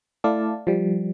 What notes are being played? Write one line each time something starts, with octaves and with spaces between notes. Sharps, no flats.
A3 E4 D5 F5 A5
F3 G3